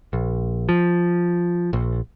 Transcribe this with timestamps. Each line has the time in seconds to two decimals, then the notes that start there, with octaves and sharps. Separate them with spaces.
0.13 A#1
0.69 F3
1.73 A#1